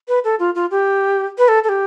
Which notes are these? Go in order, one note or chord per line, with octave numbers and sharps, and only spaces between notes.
B4
A4
F4
F4
G4
B4
A4
A4
G4